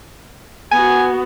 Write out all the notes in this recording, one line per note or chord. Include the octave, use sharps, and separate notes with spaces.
B3 F#4 G#5